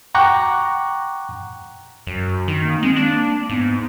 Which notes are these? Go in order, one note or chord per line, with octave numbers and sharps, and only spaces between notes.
F#5 G5 A#5 C#6 D6 F#6
F#2
D#3
A#3
G#3 C4
A#3 D4
G#2 B3